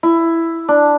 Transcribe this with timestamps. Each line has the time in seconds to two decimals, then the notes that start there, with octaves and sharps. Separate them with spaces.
0.03 E4
0.68 D4